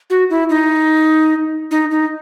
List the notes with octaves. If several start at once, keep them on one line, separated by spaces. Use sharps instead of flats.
F#4
E4
D#4
D#4
D#4